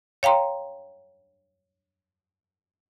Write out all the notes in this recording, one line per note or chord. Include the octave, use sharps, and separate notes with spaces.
C#5 F5 G5 A#5 C6